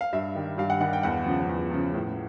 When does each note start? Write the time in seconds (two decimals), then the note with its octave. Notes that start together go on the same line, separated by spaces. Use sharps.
0.01 F5
0.13 G2 E5
0.35 D#3 G3
0.58 G2 F5
0.70 F#5
0.80 D#3 G3 F#5
0.93 G5
1.03 E2 F#5
1.26 C#3 F3
1.49 E2
1.71 C#3 F3
1.94 A2